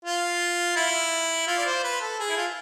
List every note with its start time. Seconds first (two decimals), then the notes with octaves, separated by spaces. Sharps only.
0.05 F4
0.76 E4
1.48 F4
1.57 D5
1.65 C5
1.84 B4
2.01 A4
2.19 G#4
2.30 E4
2.37 F4